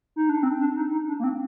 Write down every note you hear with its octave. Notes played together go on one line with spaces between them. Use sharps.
D#4
D4
C4
D4
D#4
D#4
D4
A#3
C4